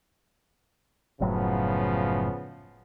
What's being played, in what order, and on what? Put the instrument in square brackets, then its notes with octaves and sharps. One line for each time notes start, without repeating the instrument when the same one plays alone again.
[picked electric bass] F#1 A2 F#3 [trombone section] C#3 F3 B3